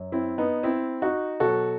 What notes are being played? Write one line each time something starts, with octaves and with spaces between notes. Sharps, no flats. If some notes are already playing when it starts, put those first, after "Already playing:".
Already playing: F#2 F#3
C4 E4
B3 D#4
C4 E4
D#4 F#4
B2 F#3 F#4 A4